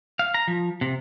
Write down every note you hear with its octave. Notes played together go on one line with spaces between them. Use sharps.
F5
A#5
F3
C3